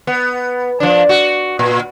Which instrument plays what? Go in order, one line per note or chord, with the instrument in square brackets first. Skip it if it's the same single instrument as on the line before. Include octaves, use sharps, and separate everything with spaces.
[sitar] B3
F3 D4
F#4
A#2